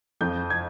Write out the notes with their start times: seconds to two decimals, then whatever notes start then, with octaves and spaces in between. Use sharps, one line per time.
0.21 F2 G6
0.50 G#6